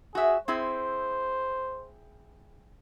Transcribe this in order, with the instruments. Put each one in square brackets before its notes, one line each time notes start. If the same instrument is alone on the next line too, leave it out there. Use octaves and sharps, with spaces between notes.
[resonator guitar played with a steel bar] F#4 E5 [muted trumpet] G#4
[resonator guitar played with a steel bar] C4 E4 G#4 [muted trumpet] C5